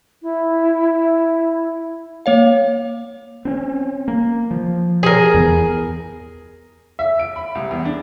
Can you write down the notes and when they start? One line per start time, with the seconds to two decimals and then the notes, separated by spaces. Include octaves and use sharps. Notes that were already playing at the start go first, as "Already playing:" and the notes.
0.22 E4
2.26 A#3 C#5 F5
3.45 C4 C#4
4.08 A#3
4.51 F3
5.03 G#4 A#4
5.34 E2 B3
6.99 E5
7.19 D7
7.36 B5
7.55 C2
7.71 E2
7.85 D4